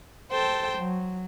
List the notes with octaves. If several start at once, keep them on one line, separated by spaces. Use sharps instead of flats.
A4 C5 G5 A5
F#3